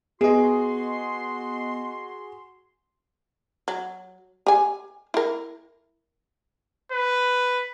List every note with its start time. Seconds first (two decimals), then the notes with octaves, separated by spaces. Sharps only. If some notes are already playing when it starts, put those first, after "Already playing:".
0.21 B3 F#4 G#4 D#5 C6
3.68 F#3
4.47 G4 G#5
5.14 E4 A#4
6.92 B4